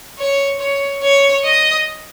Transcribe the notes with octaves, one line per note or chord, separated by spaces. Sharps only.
C#5
C#5
C#5
D#5